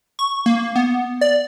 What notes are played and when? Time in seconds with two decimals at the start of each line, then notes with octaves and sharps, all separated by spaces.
0.19 C#6
0.46 A#3
0.76 B3
1.21 D5